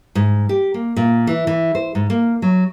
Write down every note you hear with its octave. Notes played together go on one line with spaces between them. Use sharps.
G#2
G4
A#3
A#2
E3
E3
C5
G#2
A#3
F#3